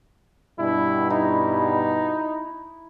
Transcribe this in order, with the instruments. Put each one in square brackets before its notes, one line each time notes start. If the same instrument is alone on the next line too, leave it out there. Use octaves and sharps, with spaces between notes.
[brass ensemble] G2 B2 G3 [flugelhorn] E4
[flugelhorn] D#4 [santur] E4